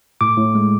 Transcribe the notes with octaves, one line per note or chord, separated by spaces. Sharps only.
A2 D6
A2
G#3